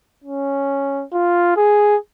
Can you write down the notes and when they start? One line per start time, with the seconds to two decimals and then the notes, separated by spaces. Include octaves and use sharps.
0.24 C#4
1.12 F4
1.56 G#4